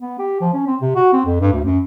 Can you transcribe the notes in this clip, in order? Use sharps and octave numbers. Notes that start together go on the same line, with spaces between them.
B3
G4
F3
C#4
C4
C3
F#4
C4
F2
G2
D2
F#2